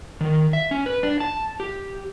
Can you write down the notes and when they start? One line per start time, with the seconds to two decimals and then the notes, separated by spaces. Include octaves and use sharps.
0.21 D#3
0.53 E5
0.71 C#4
0.86 B4
1.03 D4
1.20 A5
1.60 G4